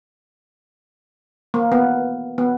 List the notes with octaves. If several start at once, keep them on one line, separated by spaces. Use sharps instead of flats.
A#3
B3
B3